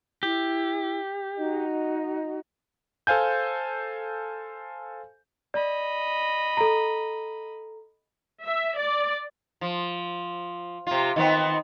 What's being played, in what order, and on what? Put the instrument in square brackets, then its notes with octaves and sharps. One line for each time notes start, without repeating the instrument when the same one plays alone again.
[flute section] E4 [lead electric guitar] G4
[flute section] D#4 F#4 D#5
[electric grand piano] A4 C5 F5 G#5 G6
[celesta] D5 [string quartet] D#5 B5
[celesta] A4 A#5
[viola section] E5
D5
[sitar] F3
C3 F4
D#3 B3 C4